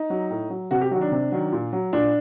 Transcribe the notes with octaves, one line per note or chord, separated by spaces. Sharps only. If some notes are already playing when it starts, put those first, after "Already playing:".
Already playing: D#4
F#3
A2
F#3
C3 F#4
G4
D#3 F#3 F#4
D4
C3
D#3 F#3
A#2
F#3
A#2 D4